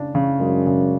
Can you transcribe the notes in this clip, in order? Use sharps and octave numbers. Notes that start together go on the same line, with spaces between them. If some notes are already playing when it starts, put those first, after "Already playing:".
Already playing: C#3 D4
C#3
F#2 G#3
C#3